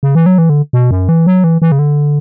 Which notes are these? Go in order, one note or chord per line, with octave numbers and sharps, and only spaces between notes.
C#3
E3
F#3
E3
D3
B2
F#2
E3
F#3
E3
E3
C#3
D3